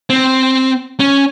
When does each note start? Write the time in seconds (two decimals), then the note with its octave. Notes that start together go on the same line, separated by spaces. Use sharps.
0.10 C4
1.00 C#4